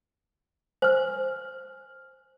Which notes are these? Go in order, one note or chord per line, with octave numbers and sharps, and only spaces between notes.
C5 G#5 F6